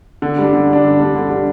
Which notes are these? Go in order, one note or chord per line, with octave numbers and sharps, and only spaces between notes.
D3
G3 D4
D3
G3 D4
D3
G3 D4
D3
G3 D4